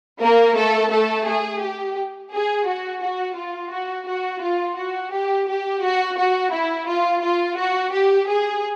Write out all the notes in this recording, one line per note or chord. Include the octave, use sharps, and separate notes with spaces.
A#3 A#4
A3 A4
A3 A4
G#4
G4
G#4
F#4
F#4
F4
F#4
F#4
F4
F#4
G4
G4
F#4
F#4
E4
F4
F4
F#4
G4
G#4